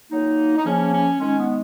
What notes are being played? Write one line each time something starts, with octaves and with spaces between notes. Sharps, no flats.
A#2 F#3 A#3 D#4
D#4
C#3 F3 A#3 C#4
C#4
D#3 G#3 C#4
B3